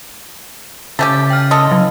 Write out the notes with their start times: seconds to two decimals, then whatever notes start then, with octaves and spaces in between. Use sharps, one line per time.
0.99 C#3 A3 C#4 G4 A6
1.30 G5 F6
1.51 A4 D#5 C6
1.71 F#3